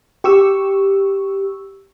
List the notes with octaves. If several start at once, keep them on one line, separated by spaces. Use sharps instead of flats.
G4 C#6 E6